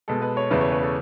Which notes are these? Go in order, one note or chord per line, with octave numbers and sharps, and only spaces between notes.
B2 G#3 A4
B4
C#5
E2 C#3 E3 A3 B4
C#5
B4
A4